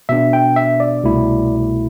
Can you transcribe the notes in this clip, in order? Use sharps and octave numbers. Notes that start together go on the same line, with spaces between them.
B2 B3 D4 E5
G5
E5
D5
C2 B2 A3 E4